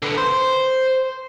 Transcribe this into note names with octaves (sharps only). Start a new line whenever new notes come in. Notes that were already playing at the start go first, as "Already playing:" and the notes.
D3 B3
C5